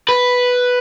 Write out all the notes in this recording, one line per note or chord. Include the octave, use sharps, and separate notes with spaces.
B4